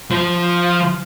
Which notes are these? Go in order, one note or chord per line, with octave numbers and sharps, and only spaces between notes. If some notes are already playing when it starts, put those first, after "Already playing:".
F3